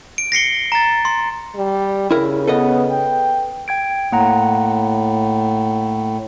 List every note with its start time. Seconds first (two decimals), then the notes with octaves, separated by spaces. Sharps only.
0.18 D7
0.32 A#6 C7 C#7 G7
0.72 A#5 A6
1.05 C6
1.55 G3
2.11 C#3 E4 A#4
2.48 B3 A4 B4 D#5
2.91 G5
3.68 G5 G#6 D7
4.12 A2 A#3 F#5 A#5